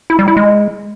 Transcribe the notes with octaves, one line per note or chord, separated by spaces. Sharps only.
E4
G3
E4
G#3